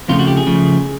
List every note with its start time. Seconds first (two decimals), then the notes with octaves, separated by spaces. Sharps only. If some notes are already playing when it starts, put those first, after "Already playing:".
0.09 F2 C#3 F3 A3 F4
0.19 F#4
0.27 G4
0.37 G#4
0.47 C#3 F3 A3